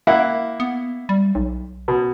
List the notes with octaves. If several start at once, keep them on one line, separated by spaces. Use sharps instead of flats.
A#3 E4 F#5
B3
G3
B1
B2